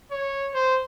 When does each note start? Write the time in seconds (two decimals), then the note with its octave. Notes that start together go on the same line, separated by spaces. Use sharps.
0.11 C#5
0.54 C5